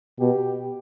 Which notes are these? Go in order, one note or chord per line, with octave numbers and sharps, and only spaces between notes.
B2 G4